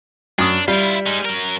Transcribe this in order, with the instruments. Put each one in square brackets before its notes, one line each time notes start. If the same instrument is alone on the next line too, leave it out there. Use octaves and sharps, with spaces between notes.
[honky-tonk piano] F#2 D#6 [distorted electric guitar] D4
[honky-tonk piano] G3 [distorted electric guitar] E4 F4
[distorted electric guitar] G#3 D#4
F#3 A#4